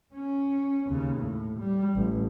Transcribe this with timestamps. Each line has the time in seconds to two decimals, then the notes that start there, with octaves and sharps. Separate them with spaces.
0.14 C#4
0.90 D#2 C#3
1.19 A2
1.60 G3
1.95 A1